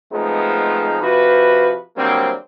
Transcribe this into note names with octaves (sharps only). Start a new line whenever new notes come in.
F3 G#3 A3 B3 C4 D#4
C3 F3 F#4 B4
D3 F#3 G3 A#3 C4